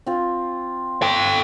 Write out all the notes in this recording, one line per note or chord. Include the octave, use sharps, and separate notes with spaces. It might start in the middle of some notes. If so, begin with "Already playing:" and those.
C4 F4
A4 G5